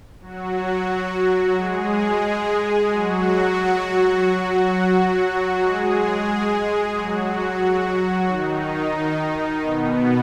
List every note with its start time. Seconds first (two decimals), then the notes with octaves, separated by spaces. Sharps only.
0.21 F#3 F#4
1.56 G#3 G#4
2.90 F#3 F#4
5.58 G#3 G#4
6.93 F#3 F#4
8.27 D#3 D#4
9.61 B2 B3